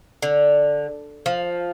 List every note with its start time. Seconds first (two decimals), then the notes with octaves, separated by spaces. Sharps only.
0.22 D3
1.26 F3